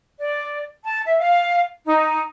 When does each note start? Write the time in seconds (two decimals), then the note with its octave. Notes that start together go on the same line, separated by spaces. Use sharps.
0.19 D5
0.85 A5
1.06 E5
1.19 F5
1.86 D#4